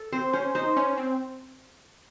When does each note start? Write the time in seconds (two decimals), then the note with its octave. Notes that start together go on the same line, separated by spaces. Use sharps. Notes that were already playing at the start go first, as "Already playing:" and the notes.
Already playing: A4
0.12 C4 C5
0.33 C#4 C5
0.55 D#4 C5
0.76 C#4
0.97 C4